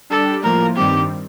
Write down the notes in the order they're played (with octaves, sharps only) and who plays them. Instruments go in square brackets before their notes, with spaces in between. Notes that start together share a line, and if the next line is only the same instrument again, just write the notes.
[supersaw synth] G3 D4 G4 D5 [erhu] A4
[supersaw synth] A2 F3 A#3 F4 [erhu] A#4
[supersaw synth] G2 D#3 G3 C4 [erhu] G4